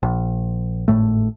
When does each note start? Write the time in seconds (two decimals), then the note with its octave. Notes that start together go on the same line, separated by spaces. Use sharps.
0.03 A#1
0.88 G#1 A2 A3